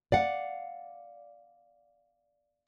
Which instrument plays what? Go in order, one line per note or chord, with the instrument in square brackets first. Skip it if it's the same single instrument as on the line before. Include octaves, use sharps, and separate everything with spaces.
[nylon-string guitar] D5 F5 F#5